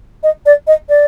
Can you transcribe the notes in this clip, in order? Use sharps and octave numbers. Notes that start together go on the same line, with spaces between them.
D#5
D5
D#5
D5